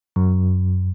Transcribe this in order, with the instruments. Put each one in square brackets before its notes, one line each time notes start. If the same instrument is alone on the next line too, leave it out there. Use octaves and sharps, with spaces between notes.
[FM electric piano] F#2